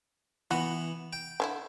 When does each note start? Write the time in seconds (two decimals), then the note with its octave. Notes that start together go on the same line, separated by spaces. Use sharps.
0.51 E3 B3 F#4
1.13 G5
1.40 D3 C#4 E4